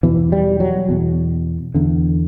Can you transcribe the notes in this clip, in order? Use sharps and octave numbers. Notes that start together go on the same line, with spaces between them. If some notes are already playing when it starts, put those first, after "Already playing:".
E2 B2 E3
G3
F#3
E2 B2
E2 D3